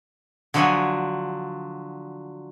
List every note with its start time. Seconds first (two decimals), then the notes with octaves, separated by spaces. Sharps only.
0.54 D3 F3 F#3 F#4 F5 G#5